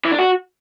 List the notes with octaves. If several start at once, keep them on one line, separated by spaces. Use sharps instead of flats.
E3
D4
F#4